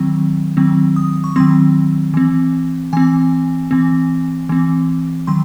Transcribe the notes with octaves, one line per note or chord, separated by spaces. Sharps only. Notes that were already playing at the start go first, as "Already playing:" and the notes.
Already playing: D#3 F#3 C4
D#3 F#3 C4
D#6
C#6
D#3 F#3 C4 C6
E3 C4
E3 C4 G#5
E3 C4
E3 C4
D#3 F#3 C6